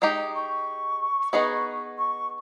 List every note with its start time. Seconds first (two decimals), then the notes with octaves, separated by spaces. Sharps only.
0.02 G#3 D#4 G4 D#6
0.34 C#6
1.33 B3 D#4 G#4 B4 D#5
1.98 C#6